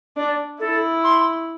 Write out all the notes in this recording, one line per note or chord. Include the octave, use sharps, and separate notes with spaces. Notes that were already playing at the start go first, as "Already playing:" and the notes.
D4 D5
E4 A4
C6